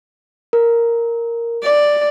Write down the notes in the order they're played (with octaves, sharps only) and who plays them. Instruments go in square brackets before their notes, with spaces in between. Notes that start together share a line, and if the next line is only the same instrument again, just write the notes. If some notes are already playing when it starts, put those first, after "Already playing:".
[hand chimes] A#4
[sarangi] D5